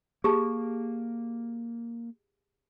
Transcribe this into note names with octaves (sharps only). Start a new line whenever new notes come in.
A#3 G4 G#4 A5